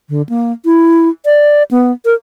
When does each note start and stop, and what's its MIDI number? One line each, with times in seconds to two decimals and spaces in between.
0.09 0.22 50
0.29 0.52 58
0.65 1.09 64
1.25 1.63 74
1.71 1.92 59
2.05 2.15 70